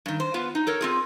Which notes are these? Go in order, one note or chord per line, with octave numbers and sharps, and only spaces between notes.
G2 D#3
C5
B3 F4 B4
D#4
A4 A#4 C#5
C4 F4 G#4